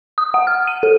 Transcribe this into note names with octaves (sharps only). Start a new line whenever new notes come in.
D#6
F#5
F6
D#7
A4